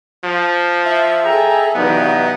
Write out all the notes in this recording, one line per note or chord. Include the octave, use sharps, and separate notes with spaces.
F3
E5
G#4 A4 D#5 G5 G#5 A#5
G2 C3 E3 F#3 B3 D#4